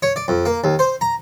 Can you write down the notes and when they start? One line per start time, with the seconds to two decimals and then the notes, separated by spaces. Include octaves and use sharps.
0.03 C#5
0.16 D5
0.28 F2
0.46 A#3
0.64 D#2
0.79 C5
1.01 A#5